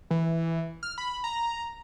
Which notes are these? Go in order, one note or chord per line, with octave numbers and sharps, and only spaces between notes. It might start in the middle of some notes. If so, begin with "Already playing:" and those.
E3
F6
B5
A#5